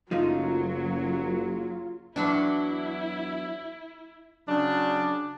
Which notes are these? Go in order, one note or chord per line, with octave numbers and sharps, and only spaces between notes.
F#1 F#2 F#3 A3 D#4 F4
E2 F#3 D4 E4
C#3 F#3 D4